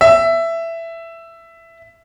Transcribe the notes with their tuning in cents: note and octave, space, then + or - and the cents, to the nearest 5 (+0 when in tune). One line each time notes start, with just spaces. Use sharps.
E5 +10